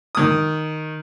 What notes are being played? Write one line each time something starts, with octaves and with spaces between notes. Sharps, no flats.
D#3 D#6